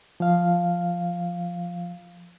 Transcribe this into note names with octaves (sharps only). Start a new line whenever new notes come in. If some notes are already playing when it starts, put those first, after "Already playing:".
F3 F5